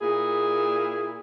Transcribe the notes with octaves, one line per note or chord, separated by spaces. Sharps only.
A#2 E4 G#4